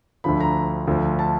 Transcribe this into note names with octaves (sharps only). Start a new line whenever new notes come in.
D2 D3 F3 B5
A#5
D2 D3 F3
A5